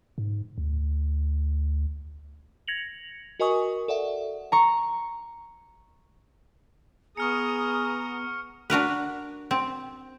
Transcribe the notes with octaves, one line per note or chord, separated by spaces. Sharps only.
G#2
D2
G#6 A#6 C#7 F7 F#7
F#4 A#4 D#5 G#5 C#6 D#6
A4 D5 E5 F#5
A#5 C#6
B3 G#4 A#5 C#6 D#6 F6 C#7
D4 F#4 A#4 B4
C4